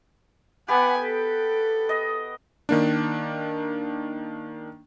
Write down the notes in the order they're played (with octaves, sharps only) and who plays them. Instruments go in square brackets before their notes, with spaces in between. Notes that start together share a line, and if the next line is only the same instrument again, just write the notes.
[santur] B3 G4 [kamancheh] F#5 G#5
[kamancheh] A4
[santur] D#5
[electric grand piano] D#3 A#3 D4